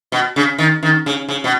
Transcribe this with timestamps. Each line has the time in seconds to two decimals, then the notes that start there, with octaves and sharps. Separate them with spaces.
0.12 B2
0.36 C#3
0.58 D#3
0.83 D#3
1.06 C#3
1.29 C#3
1.44 B2